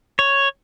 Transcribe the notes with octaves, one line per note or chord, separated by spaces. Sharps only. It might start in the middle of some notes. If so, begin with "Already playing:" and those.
C#5